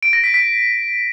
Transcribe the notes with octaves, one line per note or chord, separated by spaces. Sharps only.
D7
A#6
B6
B6